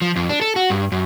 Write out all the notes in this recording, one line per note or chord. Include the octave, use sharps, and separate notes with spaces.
F3
F2
D4
A4
F#4
G2
F#2